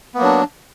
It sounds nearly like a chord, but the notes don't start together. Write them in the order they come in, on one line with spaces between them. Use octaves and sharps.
B3 A#3 F#3 D4